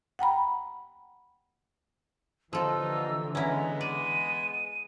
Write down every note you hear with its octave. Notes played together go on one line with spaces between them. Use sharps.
F#5 G5 A#5 B5
D#2 D3 E3 F3 D#4 F4 A4 E6
G#3 B3 C#4 E4 A#5
D5 D#7